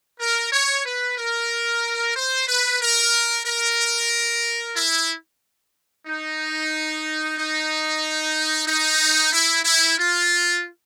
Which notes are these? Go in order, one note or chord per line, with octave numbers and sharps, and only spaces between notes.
A#4
C#5
B4
A#4
C5
B4
A#4
A#4
E4
D#4
D#4
D#4
E4
E4
F4